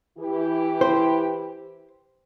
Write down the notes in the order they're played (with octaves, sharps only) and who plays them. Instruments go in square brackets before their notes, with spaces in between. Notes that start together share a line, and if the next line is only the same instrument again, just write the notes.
[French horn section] E3 E4 G4
[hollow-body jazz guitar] C5